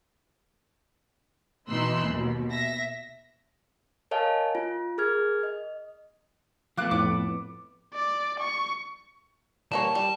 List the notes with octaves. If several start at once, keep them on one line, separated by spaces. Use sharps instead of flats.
B2 E3 D#4 C6 E6 F#6
D#2 B2
E5 A#6
A#4 C#5 D#5 F5 G#5 A5
F4
G#4 A#4 F6 G#6
D#5
F3 A3 B3 F5 D6 F#6
F2 A2 D6
D5
C#6
G3 A#3 C#5 A5
G3